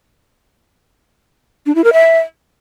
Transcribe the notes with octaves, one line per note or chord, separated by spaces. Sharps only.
D4
E4
A#4
E5